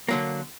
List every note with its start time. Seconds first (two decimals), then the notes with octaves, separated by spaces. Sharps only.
0.08 D3 F#3 A#3